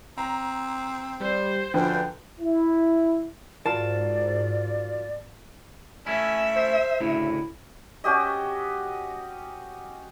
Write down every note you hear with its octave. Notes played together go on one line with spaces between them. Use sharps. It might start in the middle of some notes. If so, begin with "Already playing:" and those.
C4 A#5
G3 C5
F#2 D3 F3 B4 G5
E4
G#2 F4 F#4 A#4 D5 A5
A3 C#4 E4 E5 G#5
C5
D2 A2 C#3 E4
C#4 F#4 G4 D#5